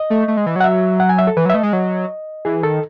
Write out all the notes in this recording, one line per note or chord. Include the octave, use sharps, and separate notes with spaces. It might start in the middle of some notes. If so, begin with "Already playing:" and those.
Already playing: D#5
A3
A3
G#3
E3
F#3 F#5
E5
F#5
G#5
E5
A4
E3 B4
F#3
E5
A3 D#5
G#3
F#3
E3 G#4
D#3 A4